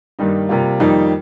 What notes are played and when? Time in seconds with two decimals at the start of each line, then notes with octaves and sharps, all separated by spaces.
0.19 G2 D#3 G3 A#3 D#4
0.49 C3 G3 A#3 F4
0.80 F2 D#3 G3 A#3 D#4